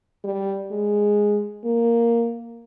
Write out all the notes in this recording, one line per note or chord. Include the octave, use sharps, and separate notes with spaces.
G3
G#3
A#3